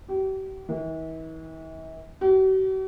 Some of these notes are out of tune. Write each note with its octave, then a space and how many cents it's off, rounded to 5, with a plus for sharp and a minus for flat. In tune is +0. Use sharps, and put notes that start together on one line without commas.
G4 -40
E3 -45
F#4 +45